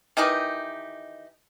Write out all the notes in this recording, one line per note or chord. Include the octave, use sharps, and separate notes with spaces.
D#3 E3 D#4 G4